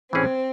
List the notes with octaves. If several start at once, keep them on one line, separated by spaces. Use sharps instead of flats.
A2 E3 A3 C4 C#4 G#4